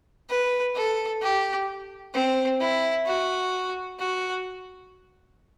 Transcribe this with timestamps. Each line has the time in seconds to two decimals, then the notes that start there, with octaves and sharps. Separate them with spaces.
0.30 B4
0.75 A4
1.22 G4
2.14 C4
2.61 E4
3.06 F#4
3.99 F#4